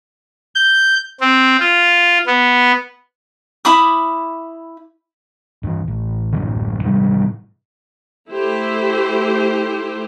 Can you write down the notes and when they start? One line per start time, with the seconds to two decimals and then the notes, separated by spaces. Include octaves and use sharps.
0.55 G6
1.21 C4
1.60 F4
2.27 B3
3.65 E4 B5 D6 D#6
5.63 G2 E3
5.88 A1
6.33 A1 F#2 D3
6.83 G#2 C3 G3
8.31 A3 E4 G4 C5